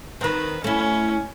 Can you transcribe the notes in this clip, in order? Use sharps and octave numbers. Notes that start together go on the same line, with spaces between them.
D#3 C4 B4
A3 C#4 E4